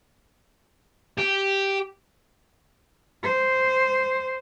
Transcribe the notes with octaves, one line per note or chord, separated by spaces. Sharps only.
G4
C5